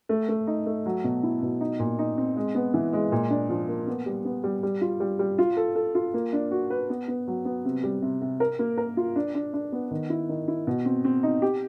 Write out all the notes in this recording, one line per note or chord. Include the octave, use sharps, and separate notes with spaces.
A3
A3
D#4
A3
F#3
B2
E4
B2
D#4
A#2
D#4
C4
G#3
B3
E3
G#3
A#2
D4
F3
A#3
B3
G3
B3
G3
G3
F4
G3
G3
F4
A4
A4
F4
A#3
D4
F#4
B4
B3
B3
F#3
B3
C3
G3
C3
C3
A#4
A#3
A#4
F4
D4
D4
D4
B3
D#3
E4
D#3
E4
B2
C4
C4
D#4
G4